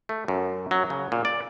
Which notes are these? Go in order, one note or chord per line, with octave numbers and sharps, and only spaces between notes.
A3
F#2
F#3
C#3
A#2
D5